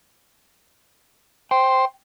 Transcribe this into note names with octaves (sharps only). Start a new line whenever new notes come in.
C5 G5